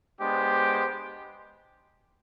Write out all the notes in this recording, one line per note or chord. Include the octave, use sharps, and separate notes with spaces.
G#3 B3 D4 G4 C5